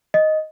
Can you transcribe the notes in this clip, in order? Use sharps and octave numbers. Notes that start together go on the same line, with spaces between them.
D#5